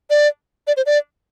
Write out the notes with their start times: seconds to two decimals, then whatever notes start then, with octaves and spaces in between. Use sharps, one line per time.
0.10 D5
0.67 D5
0.77 C5
0.86 D5